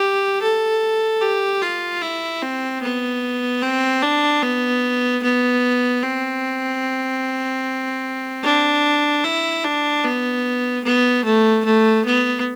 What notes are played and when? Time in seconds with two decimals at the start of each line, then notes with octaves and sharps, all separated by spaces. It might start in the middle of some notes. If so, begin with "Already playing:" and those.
Already playing: G4
0.42 A4
1.21 G4
1.62 F4
2.02 E4
2.42 C4
2.82 B3
3.62 C4
4.03 D4
4.43 B3
5.23 B3
6.03 C4
8.44 D4
9.23 E4
9.64 D4
10.05 B3
10.84 B3
11.25 A3
11.65 A3
12.05 B3